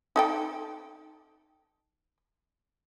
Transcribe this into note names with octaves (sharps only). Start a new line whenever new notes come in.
D#4 A4 G5